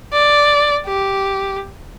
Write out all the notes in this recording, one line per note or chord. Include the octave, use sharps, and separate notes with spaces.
D5
G4